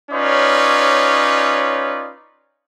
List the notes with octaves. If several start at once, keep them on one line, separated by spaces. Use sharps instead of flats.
C#4 D#4 F4 B4 C#5 D5